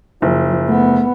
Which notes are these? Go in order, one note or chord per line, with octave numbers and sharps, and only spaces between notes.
F#1 F3
A3 B3